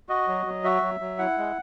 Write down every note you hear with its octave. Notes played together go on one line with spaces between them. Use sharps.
F#4 D#5
F#3
F#3
F#4 E5
F#3
F#3
E4 F#5
G#3